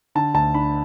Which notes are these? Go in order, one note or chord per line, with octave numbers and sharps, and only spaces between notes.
D3 A5
D2 A5
D4 B5